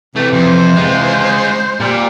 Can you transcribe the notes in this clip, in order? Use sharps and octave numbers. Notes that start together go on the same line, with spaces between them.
C3 E3 A3 G4
F2 C5
G#3 F4
A#2 G3